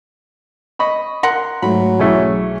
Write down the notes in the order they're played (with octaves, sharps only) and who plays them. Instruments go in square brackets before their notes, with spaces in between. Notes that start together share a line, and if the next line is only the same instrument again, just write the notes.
[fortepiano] D#5 B5 C#6
[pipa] A#4 F#5 [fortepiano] C6
[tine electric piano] G#2 A3 [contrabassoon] F#3 [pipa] B5
[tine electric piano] B1 G#4 [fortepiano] E3 A3 C#4